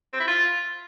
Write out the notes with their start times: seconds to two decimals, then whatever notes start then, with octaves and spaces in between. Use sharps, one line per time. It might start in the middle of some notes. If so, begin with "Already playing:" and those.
0.13 C4
0.20 E4
0.27 F4